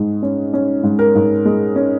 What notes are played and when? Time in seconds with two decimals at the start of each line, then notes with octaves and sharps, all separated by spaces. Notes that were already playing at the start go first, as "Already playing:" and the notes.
Already playing: G#2 G#3
0.23 C#4
0.54 C#4
0.83 G#2
0.99 A#4
1.15 G#2
1.45 G#3
1.76 C#4